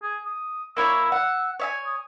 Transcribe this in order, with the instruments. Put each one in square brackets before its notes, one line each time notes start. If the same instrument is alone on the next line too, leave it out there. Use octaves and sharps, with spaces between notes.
[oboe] G#4
D#6
[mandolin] A#3 E4 C#5 [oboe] E6
[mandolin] F#5
C#5 E5 G#5
[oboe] D#6